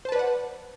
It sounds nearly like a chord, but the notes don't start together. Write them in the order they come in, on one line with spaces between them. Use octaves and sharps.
C5 A5 B4 D5 F#5